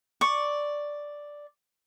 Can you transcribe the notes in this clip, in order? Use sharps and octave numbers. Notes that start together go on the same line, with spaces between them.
D5 C#6